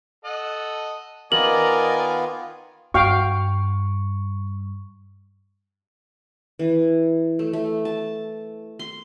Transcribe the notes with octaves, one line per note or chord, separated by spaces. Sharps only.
A4 D#5 F#5
D#3 B3 F4 A#4 D5 D#5 G#5 F#7
G2 F#4 F5 G5 C#6
E3
A3
A3
A5
C6